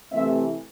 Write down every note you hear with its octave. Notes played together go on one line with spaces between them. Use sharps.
C3 E3 A3 C4 E5